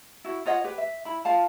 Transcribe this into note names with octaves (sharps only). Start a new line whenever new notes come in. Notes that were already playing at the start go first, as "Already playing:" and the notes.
E4 F#4
F4 C#5 D#5 F#5
G4 B4
E5
E4 B5
F4 F5 A5